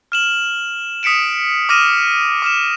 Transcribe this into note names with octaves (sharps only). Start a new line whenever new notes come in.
F6 E7 F#7
D#6 B6 C#7 D7 E7
D6 D#6 F6 A#6 D#7 E7
D6 F6 E7